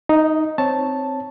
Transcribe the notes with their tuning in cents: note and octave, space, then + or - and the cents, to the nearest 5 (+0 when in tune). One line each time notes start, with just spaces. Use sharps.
D#4 +0 D#5 +45
C4 +0 C#5 +0 A5 +0